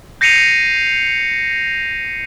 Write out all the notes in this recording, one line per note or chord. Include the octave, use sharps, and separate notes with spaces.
G6 A#6 C7 C#7 D#7 F7